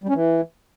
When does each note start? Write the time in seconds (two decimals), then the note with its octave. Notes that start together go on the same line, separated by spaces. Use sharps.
0.04 G3
0.09 C#4
0.15 E3